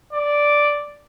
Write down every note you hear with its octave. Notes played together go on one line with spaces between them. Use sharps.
D5